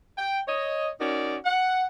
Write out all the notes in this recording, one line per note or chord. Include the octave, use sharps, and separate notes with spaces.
G5
C#5 D#5
C#4 D#4 F#4 A#4 D5
F#5